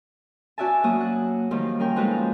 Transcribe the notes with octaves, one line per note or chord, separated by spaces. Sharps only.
C#4 F#4 D5 E5 G#5 A5
F#3 A#3 F#4 D#6
F#5
D#3 F3 G3 A#3 F4
C#4 A#4 G5
F3 G#3 D#4 F#4 A4 B4